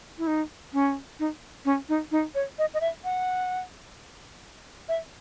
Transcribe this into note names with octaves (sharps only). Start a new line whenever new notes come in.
E4
D#4
C#4
D#4
C#4
D#4
D#4
C#5
D#5
D#5
E5
F#5
E5